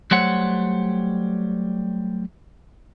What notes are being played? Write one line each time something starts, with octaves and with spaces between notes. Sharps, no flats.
F#3 G3 A3 C5 C#5 F#5